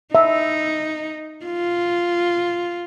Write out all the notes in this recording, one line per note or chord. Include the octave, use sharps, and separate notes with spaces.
D#4 E5
F4